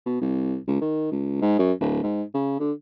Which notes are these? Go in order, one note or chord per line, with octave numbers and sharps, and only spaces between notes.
B2
C2
C#2
D#3
C#2
G#2
F#2
D1
G#2
C#3
D3